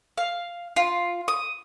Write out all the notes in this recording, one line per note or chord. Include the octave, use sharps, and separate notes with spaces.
F5
F4
D#6